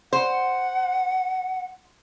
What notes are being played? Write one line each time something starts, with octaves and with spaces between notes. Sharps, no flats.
C5 F#5